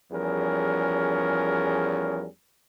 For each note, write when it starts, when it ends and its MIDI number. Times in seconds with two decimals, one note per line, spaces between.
0.12 2.26 40
0.12 2.26 53
0.12 2.26 55
0.12 2.26 61
0.12 2.26 68
0.12 2.26 70